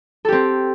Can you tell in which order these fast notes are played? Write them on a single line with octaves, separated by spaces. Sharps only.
A4 G4 C4